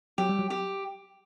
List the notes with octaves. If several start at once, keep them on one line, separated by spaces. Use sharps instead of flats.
F#3 G4
G3
F#3
G4